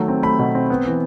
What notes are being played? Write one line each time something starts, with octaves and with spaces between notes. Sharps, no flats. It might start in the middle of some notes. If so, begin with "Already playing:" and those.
Already playing: D#3 F#3 A3
C4
A3 B5
B2
C4
B3
E3